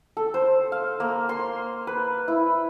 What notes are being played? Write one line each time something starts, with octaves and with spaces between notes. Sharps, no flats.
A4
C5
F5
A#3
C6
B4
E4